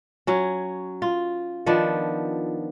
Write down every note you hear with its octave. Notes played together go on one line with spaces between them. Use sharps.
F#3 C#4
F4
D#3 F3 B3 D4